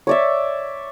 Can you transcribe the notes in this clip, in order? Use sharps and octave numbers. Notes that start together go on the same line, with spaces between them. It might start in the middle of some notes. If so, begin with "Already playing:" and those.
C#5 D5 E5